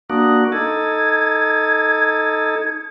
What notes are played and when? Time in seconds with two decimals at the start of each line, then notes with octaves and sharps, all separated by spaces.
0.10 A#3 D4 F#4 D#6
0.52 D#4 A4 G#6